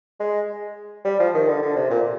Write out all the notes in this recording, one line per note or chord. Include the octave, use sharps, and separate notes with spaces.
G#3
G3
F3
D#3
D3
D3
C3
A#2